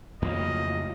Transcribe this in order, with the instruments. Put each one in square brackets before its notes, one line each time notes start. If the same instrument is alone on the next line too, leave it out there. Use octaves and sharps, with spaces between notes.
[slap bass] F2 C#3 A#3 [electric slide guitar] A2 F3 F#3 [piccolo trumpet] D#5